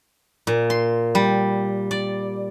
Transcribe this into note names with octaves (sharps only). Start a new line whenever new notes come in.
A#2
C6
G3
D5